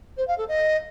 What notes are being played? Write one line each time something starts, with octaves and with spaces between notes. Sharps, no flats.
C5
F5
A4
D#5